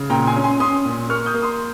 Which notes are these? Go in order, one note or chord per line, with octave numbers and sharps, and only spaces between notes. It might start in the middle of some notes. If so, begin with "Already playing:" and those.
Already playing: C#3
A#2 G5 A#5
G#5 C6
C#4
G#5 C6
C#4 C6 D#6
A#2
A#3 C#6 F6
D#6 G6
A#3
C6 D#6